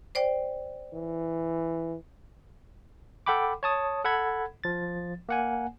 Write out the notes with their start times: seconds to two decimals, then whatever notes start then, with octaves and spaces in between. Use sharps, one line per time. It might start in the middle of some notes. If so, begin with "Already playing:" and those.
0.15 C5 D5 G5
0.93 E3
3.26 A4 F#5 G5 B5 D6
3.63 C#5 A5 D#6
4.05 A4 F#5 B5 G#6
4.64 F3 A6
5.29 A#3 F#5 G#5